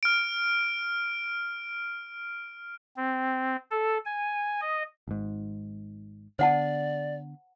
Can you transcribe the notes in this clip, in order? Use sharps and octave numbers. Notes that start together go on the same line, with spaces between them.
F6 D7
C4
A4
G#5
D#5
G#1 G#2
D3 B3 C5 D5 F#5 A5